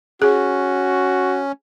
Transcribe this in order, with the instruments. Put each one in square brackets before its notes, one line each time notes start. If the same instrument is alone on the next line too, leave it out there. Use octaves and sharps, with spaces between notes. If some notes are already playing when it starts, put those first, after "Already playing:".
[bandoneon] C#4 [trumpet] F#4 [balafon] G#4